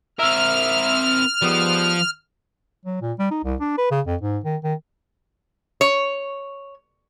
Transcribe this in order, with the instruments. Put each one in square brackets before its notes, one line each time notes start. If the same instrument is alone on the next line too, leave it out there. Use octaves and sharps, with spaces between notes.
[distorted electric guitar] C4 A#4 [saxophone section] E5 [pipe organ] F6
[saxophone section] G#2 G3 B3 [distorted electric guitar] F3
[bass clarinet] F#3
A#2
G3
D#4
C2
D4
B4
C#3
F2
G#2
D#3
D#3
[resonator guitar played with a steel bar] C#5